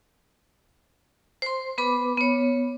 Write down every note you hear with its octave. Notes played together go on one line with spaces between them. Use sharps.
C5 C6
B3 B4 B5 D6
B3 C#5